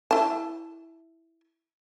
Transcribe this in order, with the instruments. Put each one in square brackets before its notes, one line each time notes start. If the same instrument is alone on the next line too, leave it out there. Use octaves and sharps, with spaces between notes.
[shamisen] E4 A5